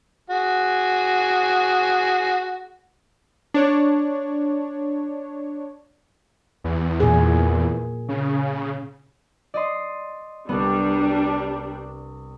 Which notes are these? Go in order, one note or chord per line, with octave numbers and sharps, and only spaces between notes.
F#4 G#4
D4 C#5
E2
A#2 G#4
C#3
D5 D#5 C6
C2 G3 B3 D4